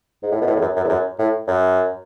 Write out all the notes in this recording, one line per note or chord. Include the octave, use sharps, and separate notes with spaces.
G#2
A2
B2
A2
E2
F#2
F#2
E2
F#2
A2
F#2